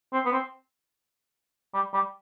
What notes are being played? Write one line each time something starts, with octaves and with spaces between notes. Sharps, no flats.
C4
B3
C4
G3
G3